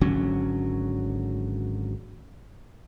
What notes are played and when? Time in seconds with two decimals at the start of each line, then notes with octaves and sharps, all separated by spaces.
0.01 G#1 D3 F#3 C#4